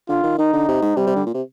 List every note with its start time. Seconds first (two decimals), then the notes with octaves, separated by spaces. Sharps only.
0.09 D3 F4
0.23 D#3
0.38 D#3 D#4
0.53 D3
0.68 C3
0.82 G#2
0.97 C3 G3
1.07 C3
1.16 D3
1.26 A#2
1.34 C3